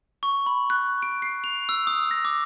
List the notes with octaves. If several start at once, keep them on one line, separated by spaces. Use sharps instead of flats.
C#6
B5
F#6
D7
C7
F7
E6
D#6
A#6
D6